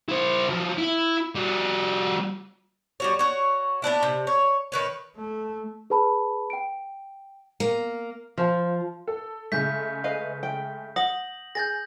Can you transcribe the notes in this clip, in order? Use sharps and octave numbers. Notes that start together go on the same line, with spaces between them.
E4 C5
F3 F#3
E4
G3 F#4
G3 F#4 C#5
F#4 C#5
B3 C#4 D4 E4
C3
C#5
D#3 B4 C#5
A3
G#4 B4 A5 B5
G5 D7
A#3
F3
A4
C#3 G#3 A3 G6 B6
B4 D#5 F5
G5
F#5 D#6 A#6 F#7
G#4 G6 A6 A#6